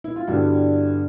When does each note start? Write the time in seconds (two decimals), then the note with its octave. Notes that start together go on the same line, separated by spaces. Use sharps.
0.04 E4
0.16 F4
0.27 G2 D3 G3 B3 E4 F#4